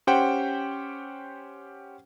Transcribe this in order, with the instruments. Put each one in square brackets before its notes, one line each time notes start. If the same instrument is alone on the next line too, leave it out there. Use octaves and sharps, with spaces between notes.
[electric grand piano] C#4 G4 C5 F#5 G5